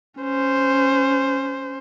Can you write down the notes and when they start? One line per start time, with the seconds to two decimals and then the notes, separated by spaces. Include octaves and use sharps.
0.19 C#4 C5